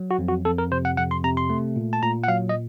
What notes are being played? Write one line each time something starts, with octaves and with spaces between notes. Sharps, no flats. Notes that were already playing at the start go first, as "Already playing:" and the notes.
Already playing: F#3
F#4
F2
F#4
F2 A4
A#4
C3 C5
F#5
F2 F#5
C6
C3 A#5
C6
A3
A#2
A5
A#2 A#5
F#5
F#3 F5
D#5